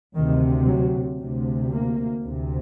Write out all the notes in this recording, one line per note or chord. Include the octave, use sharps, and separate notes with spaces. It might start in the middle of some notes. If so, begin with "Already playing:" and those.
D2 C3 D#3
F#3
D2 C3
A#3
D2 C3